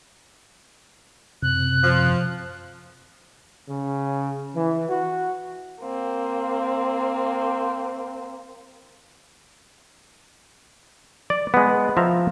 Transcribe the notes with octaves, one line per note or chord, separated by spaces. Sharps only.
F#2 C3 F#6
F3
C#3
E3
F#4
A#3 C4
D5
G#3 B3
F3 E5 A#5